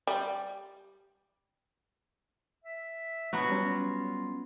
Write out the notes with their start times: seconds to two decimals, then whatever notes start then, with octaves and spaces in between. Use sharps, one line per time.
0.07 G3
2.64 E5
3.33 F#3 B3 D4 F#4
3.49 G3 C#4 F4